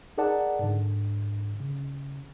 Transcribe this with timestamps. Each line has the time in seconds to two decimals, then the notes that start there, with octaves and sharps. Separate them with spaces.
0.18 D#4 G#4 A#4 D5 F#5 A5
0.59 G#2 D3
1.60 C#3